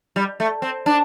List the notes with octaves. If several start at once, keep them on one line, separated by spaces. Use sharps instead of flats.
G3
A3
C4
D4